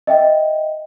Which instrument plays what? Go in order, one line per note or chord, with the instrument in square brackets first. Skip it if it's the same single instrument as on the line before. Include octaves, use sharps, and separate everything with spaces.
[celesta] D#5 E5 G5